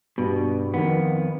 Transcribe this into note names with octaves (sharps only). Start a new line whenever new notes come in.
G2 B2
F2 D#3 B3